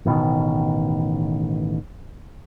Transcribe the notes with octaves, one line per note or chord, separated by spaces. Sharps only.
A1 B2 D#3